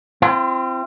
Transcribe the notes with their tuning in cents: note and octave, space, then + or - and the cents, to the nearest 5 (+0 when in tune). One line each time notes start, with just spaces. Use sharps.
C4 +0 F4 -45